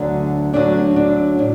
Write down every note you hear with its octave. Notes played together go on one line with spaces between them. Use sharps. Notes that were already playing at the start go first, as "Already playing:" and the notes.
Already playing: D2 D3 F#3 D4
D2 D3 F#3 D4
D4
A2 D4